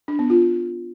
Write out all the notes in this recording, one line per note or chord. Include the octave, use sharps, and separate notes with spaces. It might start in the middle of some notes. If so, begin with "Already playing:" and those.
D4
B3
F4